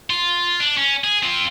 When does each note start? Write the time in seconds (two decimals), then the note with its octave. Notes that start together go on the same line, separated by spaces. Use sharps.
0.10 F4
0.60 D4
0.77 C#4
1.04 G#4
1.23 C4 F4